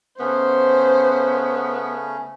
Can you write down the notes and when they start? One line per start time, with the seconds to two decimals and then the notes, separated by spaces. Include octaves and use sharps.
0.20 C#3 A3 B3 C#4 C5